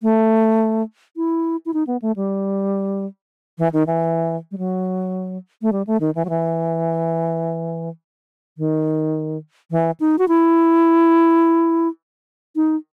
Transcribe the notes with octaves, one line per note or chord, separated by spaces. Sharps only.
A3
E4
E4
D#4
B3
A3
G3
E3
D#3
E3
G3
F#3
A3
G3
A3
D#3
E3
F#3
E3
D#3
E3
D#4
F#4
E4
D#4